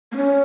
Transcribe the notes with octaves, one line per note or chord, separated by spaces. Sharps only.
A#3
C#4